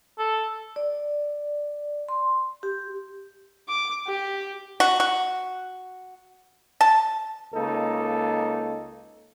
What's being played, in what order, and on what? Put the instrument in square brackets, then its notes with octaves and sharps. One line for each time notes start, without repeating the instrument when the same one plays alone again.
[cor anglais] A4
[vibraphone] D5
C6
G4
[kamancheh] D6
G4
[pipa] F#4
F#4
A5
[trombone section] C#2 A#3 D#4 A4